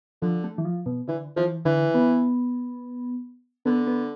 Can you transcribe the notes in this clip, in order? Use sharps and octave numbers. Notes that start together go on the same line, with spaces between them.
D3 F3
A3
E3
F3
B2
D3 E3
E3 F3
D3 E3
B3
D3 B3
B3